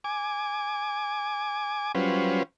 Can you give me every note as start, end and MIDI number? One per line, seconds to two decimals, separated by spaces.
0.04 1.92 80
0.04 1.92 86
1.95 2.43 54
1.95 2.43 55
1.95 2.43 61
1.95 2.43 65
1.95 2.43 71
1.95 2.43 72